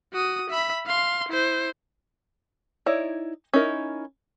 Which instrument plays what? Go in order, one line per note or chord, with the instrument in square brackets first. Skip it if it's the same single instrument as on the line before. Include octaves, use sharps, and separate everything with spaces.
[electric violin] F#4 D#6
E5 B5
F5 C6
E4 C5
[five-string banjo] D#4 E4 C#5 D5
C#4 D#4 E4 A#4